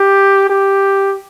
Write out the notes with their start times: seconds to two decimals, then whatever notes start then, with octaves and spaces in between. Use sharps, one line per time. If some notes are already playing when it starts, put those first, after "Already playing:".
Already playing: G4
0.50 G4